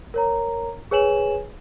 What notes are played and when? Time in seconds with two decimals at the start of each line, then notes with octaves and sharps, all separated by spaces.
0.14 A#4 C#5 A#5
0.91 G#4 B4 C#5 G#5 E7 F#7